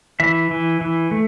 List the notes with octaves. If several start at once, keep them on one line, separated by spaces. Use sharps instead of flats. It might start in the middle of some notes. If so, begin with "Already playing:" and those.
E3 E5
E3
E3
A3